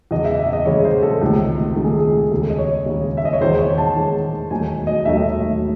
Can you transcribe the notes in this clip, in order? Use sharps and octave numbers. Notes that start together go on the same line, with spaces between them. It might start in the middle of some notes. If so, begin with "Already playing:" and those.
E2 C#3 G#3 D#5
E5
E5
D#5
E2 C#3 G#3 C#5
C5
A4
C#2 C3 D#3 A3
C#2 C3 D#3 A3 A4
G#4
G#4
D#2 C#3 G#3 A4
D#5
C#5
D#2 C#3 G#3
E5
D#5
C#5
E2 D#3 G#3 C5
C#5
A5
E2 D#3 G#3
E1 D#2 D#3 F#3 A3 G#5
D#5
E1 D#2 D#3 F#3 A3 E5